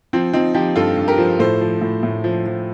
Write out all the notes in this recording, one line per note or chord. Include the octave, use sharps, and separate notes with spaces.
F3 C4
F3 C4 D#4
F3 D#4 G4
G2 F4 A4
G2
G4 A#4
F3
A2 A4 C5
F3
A2
A2
F3
F3